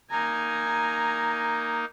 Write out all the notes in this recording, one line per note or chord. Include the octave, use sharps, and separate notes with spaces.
A#3 D#4 G#5 A#5